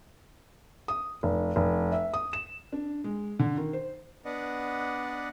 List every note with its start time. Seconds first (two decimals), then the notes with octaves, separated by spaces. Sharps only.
0.88 D#6
1.23 F1
1.56 F1
1.92 E5
2.14 D#6
2.33 E7
2.72 D4
3.04 G#3
3.39 D3
3.57 D#3
3.73 C5
4.25 B3 D4 B4 D5 D#5 F#5